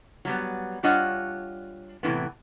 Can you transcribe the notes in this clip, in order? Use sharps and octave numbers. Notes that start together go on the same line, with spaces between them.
F#3 G3 B3
G3 D4 F4 C#5 D#5 F#5
A2 C3 D#3 E3 B3